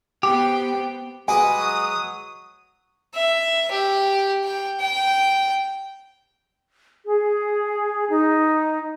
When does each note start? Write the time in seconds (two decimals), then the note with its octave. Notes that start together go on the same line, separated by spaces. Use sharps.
0.23 B3 G4 C5 G5 D6
1.28 G3 G#3 F#4 B4 G#5 D#6
1.58 F#3
3.14 E5
3.71 G4
4.44 G5
4.80 G5
7.05 G#4
8.10 D#4